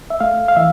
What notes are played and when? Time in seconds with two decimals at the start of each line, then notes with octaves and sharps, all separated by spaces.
0.10 E5
0.20 A3 F5
0.48 F5
0.56 E3 E5